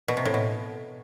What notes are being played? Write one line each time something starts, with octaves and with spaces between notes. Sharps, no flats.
B2
C3
A2
B2